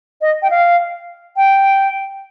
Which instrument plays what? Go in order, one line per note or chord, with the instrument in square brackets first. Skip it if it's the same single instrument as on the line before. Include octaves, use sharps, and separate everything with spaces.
[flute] D#5
G5
F5
G5